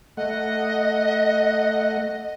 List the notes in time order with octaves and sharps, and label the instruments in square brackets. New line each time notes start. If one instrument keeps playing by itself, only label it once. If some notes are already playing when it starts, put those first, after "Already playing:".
[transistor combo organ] A3 F#5 [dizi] D#5